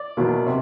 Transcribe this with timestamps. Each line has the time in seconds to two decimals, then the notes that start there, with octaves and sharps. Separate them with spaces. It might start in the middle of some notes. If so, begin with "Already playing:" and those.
Already playing: D5
0.17 E2 B2 F#3 A#3
0.47 C3